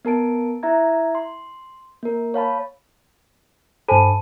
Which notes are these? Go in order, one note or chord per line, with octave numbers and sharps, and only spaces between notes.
B3 A#4 A5 D7
E4 E5 A#5 G#6
C6
A#3 A#4
C#5 F5 A5 B5
G2 A4 C5 G#5 A5 B5